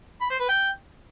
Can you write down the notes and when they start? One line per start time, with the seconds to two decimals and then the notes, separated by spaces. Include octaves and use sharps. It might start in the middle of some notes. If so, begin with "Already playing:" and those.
0.21 B5
0.30 C5
0.39 B4
0.49 G5